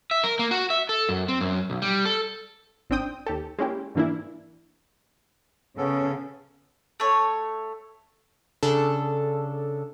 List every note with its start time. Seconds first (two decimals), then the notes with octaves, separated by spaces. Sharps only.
0.11 E5
0.24 A#4
0.39 A#3
0.51 F#4
0.70 E5
0.89 A4
1.09 F#2
1.28 C4
1.41 F#2
1.70 B1
1.82 G3
2.05 A4
2.90 G#1 C4 D4 G5 D#6
3.26 D#2 G4 A4
3.59 G#3 A#3 C#4 E4 G4
3.95 G#2 D3 E3 A#3 D4 E4
5.78 C#3 B3 C#4 A4
7.00 A3 C#5
8.63 C#3 D4 A4